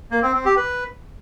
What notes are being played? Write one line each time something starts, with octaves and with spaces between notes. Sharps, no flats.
A#3
C4
C4
G4
B4